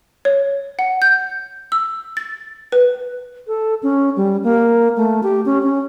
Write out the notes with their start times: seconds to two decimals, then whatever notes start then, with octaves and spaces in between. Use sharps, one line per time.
0.25 C#5
0.79 F#5
1.02 G6
1.72 E6
2.17 A6
2.72 B4
3.47 A4
3.83 C#4
4.17 G3
4.44 A#3
4.97 A3
5.23 G4
5.45 C#4
5.63 C#4